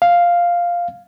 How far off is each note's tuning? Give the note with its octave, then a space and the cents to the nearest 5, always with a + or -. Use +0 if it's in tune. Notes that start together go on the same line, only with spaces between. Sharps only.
F5 +0